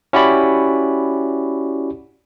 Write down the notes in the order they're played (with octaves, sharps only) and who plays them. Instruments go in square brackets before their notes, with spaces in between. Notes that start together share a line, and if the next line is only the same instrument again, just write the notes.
[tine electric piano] C#4 E4 F#4 G4 D5 B5